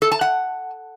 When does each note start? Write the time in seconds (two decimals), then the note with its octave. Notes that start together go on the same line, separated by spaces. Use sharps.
0.02 A4
0.12 A5
0.21 F#5